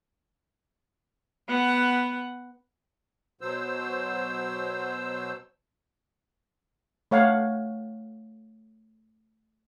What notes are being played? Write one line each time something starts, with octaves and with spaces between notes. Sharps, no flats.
B3 F#5
B2 F#3 C5 E6
A3 C#5 F5 F#5